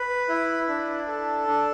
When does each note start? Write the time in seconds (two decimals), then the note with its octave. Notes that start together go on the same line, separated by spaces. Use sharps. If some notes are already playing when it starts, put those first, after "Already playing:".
Already playing: B4
0.29 E4
0.68 D4
1.08 A4
1.47 D4